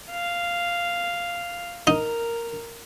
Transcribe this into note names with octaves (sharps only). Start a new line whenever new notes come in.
F5
D#4 A#4